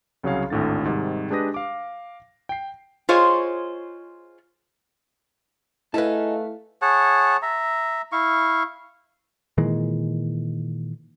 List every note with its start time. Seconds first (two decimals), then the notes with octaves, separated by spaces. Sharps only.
0.23 C2 C#3 F#3 G#4 C#5 F5
0.50 G#1 D2 A2 D3 A6
0.85 G#2 C3 D#3 G3
1.30 G#3 D4 G4 B4 D#6 A#6
1.54 F5 D6
2.49 G5 C7
3.09 F4 G#4 C5 C#5 D#5
5.94 A3 D#4 E4 G#4 A4 B4 F5 A5
6.82 G#4 C#5 F#5 A5
7.42 E5 A#5
8.12 E4 F5 C#6
9.58 A#2 D#3 E3 G#3